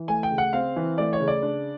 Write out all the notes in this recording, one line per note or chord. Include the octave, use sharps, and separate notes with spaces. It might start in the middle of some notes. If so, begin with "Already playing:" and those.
Already playing: E3
A3 G#5
G5
C#3
F#5
C4 F5
E3
A3 D5
C#5
C#3
D5
D4